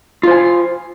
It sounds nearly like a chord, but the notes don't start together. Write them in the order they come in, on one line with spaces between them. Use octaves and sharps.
F4 C5 G#5